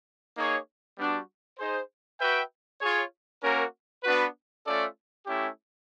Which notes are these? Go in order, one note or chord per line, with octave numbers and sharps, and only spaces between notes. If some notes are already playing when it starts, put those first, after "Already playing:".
A#3 D#4 G#4 C#5
G3 B3 D4 F#4
D#4 G#4 C5
F#4 B4 E5 G5
F4 G#4 C#5
A#3 C#4 F#4 A#4
B3 D4 F#4 B4
A3 C#4 F4 A4 D5
A3 C#4 E4 G4